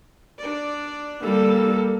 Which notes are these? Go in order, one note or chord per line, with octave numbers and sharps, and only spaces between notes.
D4 D5
G3 A#3 A4